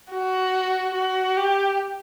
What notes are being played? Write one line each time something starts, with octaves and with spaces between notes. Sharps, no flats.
F#4
F#4
G4